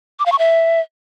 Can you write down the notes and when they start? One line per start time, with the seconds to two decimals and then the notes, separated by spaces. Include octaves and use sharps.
0.19 D6
0.26 F5
0.32 C#6
0.39 E5